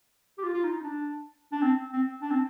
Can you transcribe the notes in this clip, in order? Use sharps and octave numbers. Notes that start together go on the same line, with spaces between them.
G4
F4
F4
D#4
D#4
D4
D4
C4
C4
D4
C4